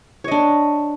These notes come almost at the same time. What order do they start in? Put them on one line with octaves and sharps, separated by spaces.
C#5 D#5 D4